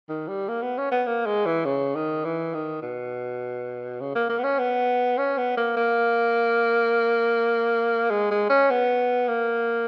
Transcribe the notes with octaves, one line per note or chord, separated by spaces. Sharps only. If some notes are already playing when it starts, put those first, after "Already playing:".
D#3
G3
A#3
B3
C#4
B3
A#3
G#3
E3
C#3
D#3
E3
D#3
B2
C#3
A#3
A#3
B3
C#4
B3
C#4
B3
A#3
A#3
G#3
G#3
C#4
B3
A#3